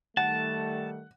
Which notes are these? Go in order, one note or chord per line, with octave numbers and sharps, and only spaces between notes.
D#3 G3 A3 F#5 A5